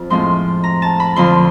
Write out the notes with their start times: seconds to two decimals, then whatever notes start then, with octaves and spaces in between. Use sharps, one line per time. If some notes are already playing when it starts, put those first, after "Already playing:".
Already playing: F2
0.10 A2 F3 G#3 C4 C6
0.64 A#5
0.82 A5
1.00 B5
1.16 F2 D3 F3 C6